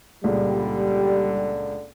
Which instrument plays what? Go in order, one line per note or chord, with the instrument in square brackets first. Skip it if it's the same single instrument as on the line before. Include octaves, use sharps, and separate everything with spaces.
[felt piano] C#2 A#2 G#3 [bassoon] D3 [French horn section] G3